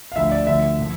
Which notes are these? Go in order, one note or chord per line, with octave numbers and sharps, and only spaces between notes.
F5
D2 D3 F3 E5
D5
D2 D3 F3 E5
A#2 F3